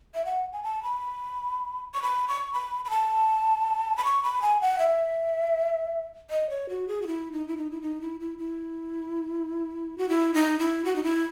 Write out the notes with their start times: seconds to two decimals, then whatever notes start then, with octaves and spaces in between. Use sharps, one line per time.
0.14 E5
0.25 F#5
0.53 G#5
0.63 A5
0.83 B5
1.94 C#6
2.02 B5
2.28 C#6
2.53 B5
2.85 B5
2.90 A5
3.97 B5
4.05 C#6
4.23 B5
4.42 G#5
4.61 F#5
4.79 E5
6.30 D#5
6.50 C#5
6.69 F#4
6.88 G#4
7.02 F#4
7.07 E4
7.32 D#4
7.48 E4
7.57 D#4
7.71 E4
7.81 D#4
8.01 E4
8.20 E4
8.38 E4
9.98 F#4
10.09 E4
10.34 D#4
10.59 E4
10.85 F#4
10.96 D#4
11.04 E4